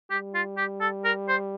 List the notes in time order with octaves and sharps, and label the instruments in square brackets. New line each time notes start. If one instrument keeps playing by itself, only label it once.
[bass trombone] G3 [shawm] G4
[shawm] F4
G4
A4
A#4
C5